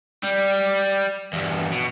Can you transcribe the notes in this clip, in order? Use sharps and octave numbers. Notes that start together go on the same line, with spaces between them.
G3
E2 G2
B2